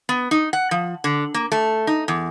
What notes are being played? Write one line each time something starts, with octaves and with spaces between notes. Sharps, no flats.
B3
D#4
F#5
F3
D3
A#3
A3
D#4
E2